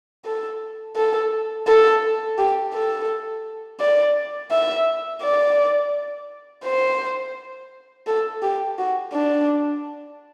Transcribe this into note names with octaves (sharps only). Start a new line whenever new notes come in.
A4
A4
A4
G4
A4
D5
E5
D5
C5
A4
G4
F#4
D4